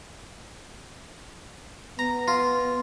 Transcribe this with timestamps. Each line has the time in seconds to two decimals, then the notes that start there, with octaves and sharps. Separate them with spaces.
1.99 B3 A#5
2.28 F4